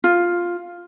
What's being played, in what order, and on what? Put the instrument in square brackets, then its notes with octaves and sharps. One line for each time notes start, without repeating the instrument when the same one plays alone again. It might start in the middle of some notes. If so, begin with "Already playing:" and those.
[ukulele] F4